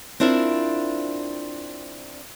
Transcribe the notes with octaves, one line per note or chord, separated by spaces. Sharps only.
C4 D4 E4 F4 A#4